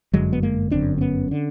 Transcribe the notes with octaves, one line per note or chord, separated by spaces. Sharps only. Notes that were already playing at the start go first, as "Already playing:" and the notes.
G1 F#2 D3 F#3 G#3
B3
G#3 A#3
G1 F#2 D3 C4 D4
C4
B3 C#4
D3